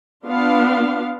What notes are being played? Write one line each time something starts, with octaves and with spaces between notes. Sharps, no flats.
B3 D4 F4 F5